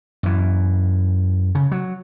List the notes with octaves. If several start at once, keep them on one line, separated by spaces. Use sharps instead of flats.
F#2 E3
C#3
F#3